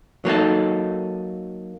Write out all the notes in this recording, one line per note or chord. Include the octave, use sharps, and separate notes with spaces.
F#3 A#3 D#4 A4